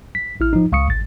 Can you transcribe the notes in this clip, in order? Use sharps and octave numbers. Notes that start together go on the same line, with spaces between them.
B6
A1 E4 F6
F3 D#4
C#2 F5 C#6 D#6 C#7
G#1 A6